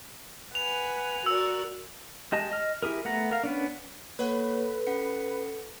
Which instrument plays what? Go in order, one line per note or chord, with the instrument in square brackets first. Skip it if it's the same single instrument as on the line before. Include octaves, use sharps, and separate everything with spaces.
[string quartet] B4 F#5 G#5 [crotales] F7
[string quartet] F#4 A#4 D5 [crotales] E6
[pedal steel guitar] G#3 G4 D#5 A5
D#5 F6
E4 G4 G#4 A#4
A3 B3 F#5 A#5
A#4 F5
B3 C#4 D4
[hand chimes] A#3 C#5 F#5 [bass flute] A4 [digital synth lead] B4
[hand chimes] C#4 F#5 C#7